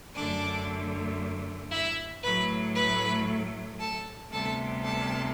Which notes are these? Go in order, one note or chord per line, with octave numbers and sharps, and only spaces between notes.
F#2 D3 A3 D4 D5
E4 E5
A2 F#3 A3 B4 B5
B4 B5
A4 A5
D2 C3 G3 B3 A4 A5
A4 A5